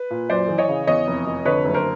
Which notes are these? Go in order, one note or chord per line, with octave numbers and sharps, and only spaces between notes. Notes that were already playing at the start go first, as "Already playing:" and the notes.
Already playing: B4
A#2
F#2 C5 D5
E3
C#5 D#5
C#3
E2 C#5 D#5
F1
F1
D3 B4 C#5
F#1
A#4 C5